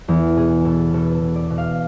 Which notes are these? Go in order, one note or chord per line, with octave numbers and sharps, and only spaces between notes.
E2 A4
B2 G#4
B2 A4
B2 A4
A4
B2
D5
B2
F5